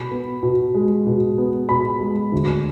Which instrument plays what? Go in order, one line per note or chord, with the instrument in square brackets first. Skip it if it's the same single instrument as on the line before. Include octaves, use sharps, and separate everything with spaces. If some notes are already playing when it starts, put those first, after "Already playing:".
Already playing: [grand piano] B2 B5
B3
B2
G#3
B2
B3
B2 B5
G#3
D2